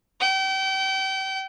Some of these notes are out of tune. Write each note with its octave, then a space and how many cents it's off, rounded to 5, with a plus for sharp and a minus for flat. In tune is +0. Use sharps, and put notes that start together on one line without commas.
G5 -35